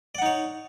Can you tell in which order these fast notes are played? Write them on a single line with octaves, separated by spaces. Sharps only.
D5 F#5 D#4 C#5